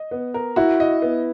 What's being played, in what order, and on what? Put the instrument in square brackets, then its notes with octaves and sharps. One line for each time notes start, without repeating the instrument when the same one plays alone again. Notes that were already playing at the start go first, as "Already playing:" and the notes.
Already playing: [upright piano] D#5
B3
A#4
[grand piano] E4 [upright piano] F#4
[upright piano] D#5
B3